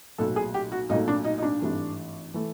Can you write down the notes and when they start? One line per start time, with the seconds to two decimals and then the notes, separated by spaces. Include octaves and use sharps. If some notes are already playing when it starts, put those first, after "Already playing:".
0.18 B1 A#2 F#3 A3 A4
0.36 G#4
0.54 G4
0.72 F#4
0.89 B1 A#2 F#3 A3 D#4
1.08 D4
1.24 D#4
1.38 D#4
1.43 D4
1.60 G#1 G2 E3 A3
2.34 E3 A3